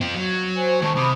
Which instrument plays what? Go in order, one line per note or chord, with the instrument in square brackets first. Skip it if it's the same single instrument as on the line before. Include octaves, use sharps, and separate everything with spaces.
[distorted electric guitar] C4 F4
F#3
[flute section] C5 G#5
[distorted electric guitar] A2 D#3 [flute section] A5 C#6
[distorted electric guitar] C3 [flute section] B5 D6 D#6